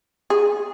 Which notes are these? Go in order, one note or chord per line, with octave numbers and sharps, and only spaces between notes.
G#4